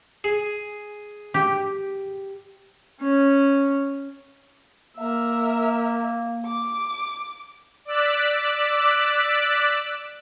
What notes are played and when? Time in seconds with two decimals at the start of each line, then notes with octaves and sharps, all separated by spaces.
0.24 G#4
1.34 G4
3.00 C#4
4.97 A#3 A#4 E5
6.46 D6
7.85 D5 D6 E6 F#6 B6